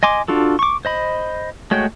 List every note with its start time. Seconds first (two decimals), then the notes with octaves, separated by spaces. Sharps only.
0.03 D#5 G#5 C6 D6
0.28 D4 F4 F#4 A4
0.59 C#6 D6
0.85 C5 D#5 B5
1.71 G#3 A3 F#4 C#5 G5